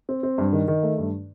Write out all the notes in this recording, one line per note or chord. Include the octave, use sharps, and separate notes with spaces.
C4
C4
G2
D#3
D#3
A3
G2